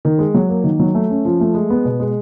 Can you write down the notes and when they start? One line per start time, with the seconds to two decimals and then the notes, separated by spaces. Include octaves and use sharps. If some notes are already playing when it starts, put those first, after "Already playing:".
0.05 D#3
0.19 G#3
0.34 F#3
0.49 A#3
0.64 D#3
0.79 F#3
0.95 A3
1.10 C#4
1.25 F3
1.40 A3
1.55 G#3
1.70 B3
1.85 B2
2.00 G#3